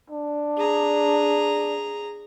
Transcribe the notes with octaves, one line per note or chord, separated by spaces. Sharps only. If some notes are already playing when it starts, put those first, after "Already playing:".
D4
G#4 A#5